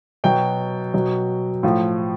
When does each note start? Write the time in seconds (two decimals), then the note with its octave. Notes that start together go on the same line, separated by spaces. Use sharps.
0.24 B2 F#3 G5
0.94 B2 F#3
1.63 A2 F3